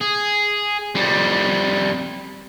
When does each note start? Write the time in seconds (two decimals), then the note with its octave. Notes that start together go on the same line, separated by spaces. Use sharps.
0.01 G#4
0.95 F2 G3